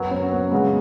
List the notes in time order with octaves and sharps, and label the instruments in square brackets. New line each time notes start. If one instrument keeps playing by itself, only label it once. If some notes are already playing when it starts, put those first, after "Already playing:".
Already playing: [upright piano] F#2 F#3 B3 [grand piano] F#4
[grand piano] C#4
B3
[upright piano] C#3 G#3 [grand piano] B3